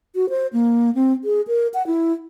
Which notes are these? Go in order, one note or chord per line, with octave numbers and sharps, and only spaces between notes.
F#4
C5
A#3
C4
G#4
A#4
F#5
E4